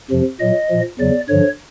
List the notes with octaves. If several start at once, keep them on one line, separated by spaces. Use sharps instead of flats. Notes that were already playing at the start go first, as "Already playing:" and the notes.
F2 C3 F3
A#2 F#3 D#5
A#2 F3
E2 C#3 F#3 D5
G2 D3 F3 C#5